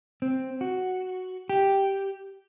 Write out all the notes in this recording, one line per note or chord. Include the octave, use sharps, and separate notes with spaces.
C4
F#4
G4